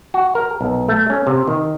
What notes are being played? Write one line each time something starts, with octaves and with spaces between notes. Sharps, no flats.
F#4
A#4
B1
A3
C#4
C3
D#3